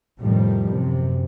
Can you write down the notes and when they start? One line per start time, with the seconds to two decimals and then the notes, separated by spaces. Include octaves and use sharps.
0.21 F2 A2 C3 D#3 F3 G3
0.70 F#2 C3